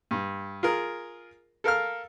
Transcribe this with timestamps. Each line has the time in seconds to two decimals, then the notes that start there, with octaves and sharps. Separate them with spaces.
0.11 G2
0.63 F4 G#4 A#4
1.64 A4 A#4 F5 F6